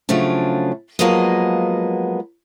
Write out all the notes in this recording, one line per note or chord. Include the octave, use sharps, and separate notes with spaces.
C#3 F3 F#3 A3 D4
F3 F#3 G#3 A#3 B3 D#5